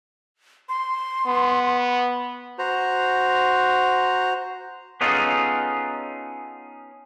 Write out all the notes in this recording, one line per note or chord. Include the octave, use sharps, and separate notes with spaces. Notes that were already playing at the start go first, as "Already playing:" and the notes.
C6
B3
F#4 C5 A#5
B3 C#4 D#4 F4 G#4 A4